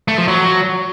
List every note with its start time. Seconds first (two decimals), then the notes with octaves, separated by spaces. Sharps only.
0.08 A3
0.18 F3
0.28 F#3